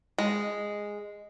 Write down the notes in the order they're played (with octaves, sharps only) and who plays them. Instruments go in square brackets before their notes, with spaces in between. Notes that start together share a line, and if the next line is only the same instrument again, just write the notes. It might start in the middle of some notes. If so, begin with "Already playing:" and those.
[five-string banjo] G#3